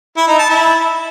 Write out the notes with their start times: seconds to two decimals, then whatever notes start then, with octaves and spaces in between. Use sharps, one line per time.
0.17 E4
0.28 D#4
0.39 A5
0.50 E4